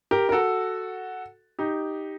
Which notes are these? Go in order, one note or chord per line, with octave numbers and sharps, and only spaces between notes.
G4 A#4
A#4
F#4 A4
D#4 G4